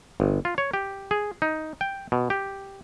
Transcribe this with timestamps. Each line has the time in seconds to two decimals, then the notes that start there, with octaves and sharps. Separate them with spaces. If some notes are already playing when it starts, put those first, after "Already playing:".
0.20 G1
0.45 F4
0.58 C#5
0.73 G4
1.11 G#4
1.42 D#4
1.81 G5
2.12 B2
2.30 G4